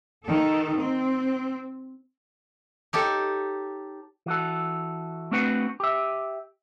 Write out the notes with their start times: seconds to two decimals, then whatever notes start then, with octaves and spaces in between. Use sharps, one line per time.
0.25 D#3 A4
0.76 C4
2.93 D#4 G4 A4 C#5
4.26 E3 F#4 A4
5.31 A3 C4 D4 F#4 B4 F#5
5.80 G4 E5